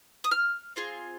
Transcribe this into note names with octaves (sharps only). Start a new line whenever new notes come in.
D#6
F6
C4 F4 G#4